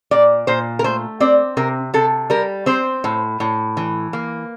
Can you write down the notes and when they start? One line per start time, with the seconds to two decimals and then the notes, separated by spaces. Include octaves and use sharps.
0.11 A#2 D5
0.47 A#2 C5
0.79 A#4
0.84 A3 C5
1.20 C4 D5
1.57 C3 A#4
1.94 C3 A4
2.30 G3 A#4
2.66 C4 C5
3.04 A2
3.40 A2
3.77 E3
4.13 A#3